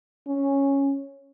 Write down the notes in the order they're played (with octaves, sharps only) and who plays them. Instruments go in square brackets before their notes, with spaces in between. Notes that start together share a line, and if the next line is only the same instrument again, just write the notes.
[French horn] C#4